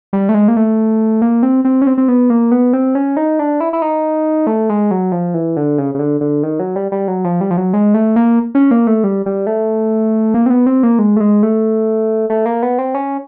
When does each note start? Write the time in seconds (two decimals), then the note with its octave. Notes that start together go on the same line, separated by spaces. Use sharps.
0.13 G3
0.29 A3
0.34 G#3
0.48 A#3
0.56 A3
1.22 A#3
1.43 C4
1.65 C4
1.82 C#4
1.87 C4
1.98 C4
2.08 B3
2.30 A#3
2.52 B3
2.73 C4
2.95 C#4
3.17 D#4
3.39 D4
3.61 E4
3.73 E4
3.82 D#4
4.47 A3
4.69 G#3
4.91 F#3
5.12 F3
5.34 E3
5.57 D3
5.78 C#3
5.95 C#3
5.99 D3
6.21 D3
6.43 D#3
6.60 F#3
6.76 G3
6.92 G3
7.08 F#3
7.24 F3
7.41 G3
7.51 F3
7.57 F#3
7.74 G#3
7.94 A3
8.16 A#3
8.55 C#4
8.71 A#3
8.87 A3
9.04 G3
9.26 G3
9.47 A3
10.34 A#3
10.46 C4
10.50 B3
10.67 C4
10.83 A#3
10.99 G#3
11.17 A3
11.20 G#3
11.43 A3
12.30 A3
12.46 A#3
12.63 B3
12.79 C4
12.95 C#4